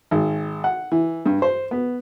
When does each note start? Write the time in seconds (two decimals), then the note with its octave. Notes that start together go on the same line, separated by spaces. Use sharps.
0.11 G#1
0.64 F#5
0.92 E3
1.26 G2
1.42 C5
1.71 B3